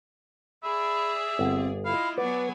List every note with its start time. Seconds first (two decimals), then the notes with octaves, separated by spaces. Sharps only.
0.64 G#4 D5 E5 B5
1.39 G1 C4
1.85 E4 F4 D#5 F5 B5
2.18 F#3 B3 B4 D5 F#5 G#5